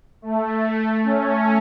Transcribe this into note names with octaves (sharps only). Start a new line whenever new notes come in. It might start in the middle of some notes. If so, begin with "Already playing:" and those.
A3
C#4